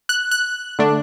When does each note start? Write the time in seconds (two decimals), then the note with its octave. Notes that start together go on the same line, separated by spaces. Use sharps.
0.09 F#6
0.31 F#6
0.79 D3 A3 D4